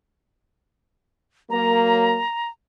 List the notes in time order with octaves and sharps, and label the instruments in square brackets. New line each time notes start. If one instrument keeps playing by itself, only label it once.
[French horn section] F#3 A#3 [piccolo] A#5